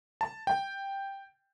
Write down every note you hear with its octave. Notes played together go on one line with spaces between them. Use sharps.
A5
G5